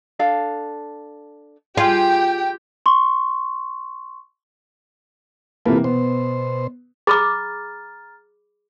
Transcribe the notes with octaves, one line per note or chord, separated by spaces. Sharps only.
D4 A4 F5
F4 G4 G#4 G5
C6 C#6
C3 E3 A#3 F4 A4 B4
B2 B3 C5
G#4 A#5 B5 D6 F6 A6